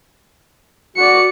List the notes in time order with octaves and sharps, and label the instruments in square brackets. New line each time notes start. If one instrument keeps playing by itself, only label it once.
[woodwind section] F#4 [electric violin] D5 C#7